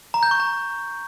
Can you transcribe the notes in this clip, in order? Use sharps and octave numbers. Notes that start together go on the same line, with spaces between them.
A#5
G6
C#6
A#5